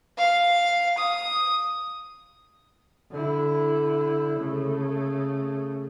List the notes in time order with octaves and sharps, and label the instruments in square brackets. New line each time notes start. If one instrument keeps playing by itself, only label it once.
[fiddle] F5
D#6
[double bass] D3 E4
C#3 A3